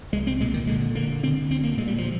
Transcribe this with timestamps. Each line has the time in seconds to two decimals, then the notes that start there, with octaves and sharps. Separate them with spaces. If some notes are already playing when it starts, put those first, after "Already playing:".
0.13 C2 G#3
0.27 C4
0.41 A#2 G#3
0.54 D#3
0.67 D3 G#3
0.95 D3 A#3
1.23 D3 C4
1.50 D2 C4
1.64 A#3
1.77 A#2 G#3
1.87 G3
1.98 F3